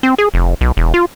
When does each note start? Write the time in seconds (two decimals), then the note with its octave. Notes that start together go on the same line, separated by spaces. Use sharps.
0.03 C4
0.18 G#4
0.34 F1
0.61 B1
0.77 E1
0.94 F4